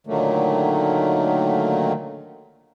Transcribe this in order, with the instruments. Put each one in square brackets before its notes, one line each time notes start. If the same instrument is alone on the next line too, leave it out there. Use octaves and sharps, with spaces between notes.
[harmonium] A#2 D3 D#3 F#3 A3 A#3